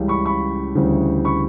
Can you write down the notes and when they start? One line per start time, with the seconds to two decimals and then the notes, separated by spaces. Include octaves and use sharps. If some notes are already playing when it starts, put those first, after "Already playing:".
Already playing: C#2 C#3 E3 G3
0.08 B5 C#6
0.25 B5 C#6
0.75 D2 C#3 E3 G3
1.24 B5 C#6